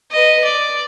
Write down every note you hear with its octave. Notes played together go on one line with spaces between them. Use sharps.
B4 D#5
D5